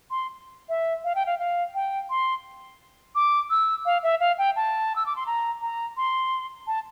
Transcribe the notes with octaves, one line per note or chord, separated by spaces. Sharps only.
C6
E5
F5
G5
F5
F5
G5
C6
D6
E6
F5
E5
F5
G5
A5
E6
D6
C6
A#5
A#5
C6
A5